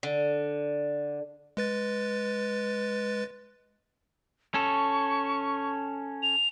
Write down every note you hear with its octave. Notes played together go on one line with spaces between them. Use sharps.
D3
G#3 B4 A6
C#4 A4 C#6
F7